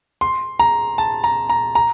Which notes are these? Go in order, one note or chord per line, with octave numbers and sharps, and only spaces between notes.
C6
A#5
A5
A#5
A#5
A#5